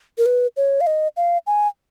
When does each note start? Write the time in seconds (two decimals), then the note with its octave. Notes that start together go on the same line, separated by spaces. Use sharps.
0.18 A#4
0.26 B4
0.57 C#5
0.81 F5
0.87 D#5
1.17 F5
1.47 G#5